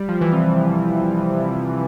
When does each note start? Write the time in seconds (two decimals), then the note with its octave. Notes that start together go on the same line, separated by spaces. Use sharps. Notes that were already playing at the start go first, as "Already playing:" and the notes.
Already playing: G3
0.08 F3
0.21 E3
0.33 C3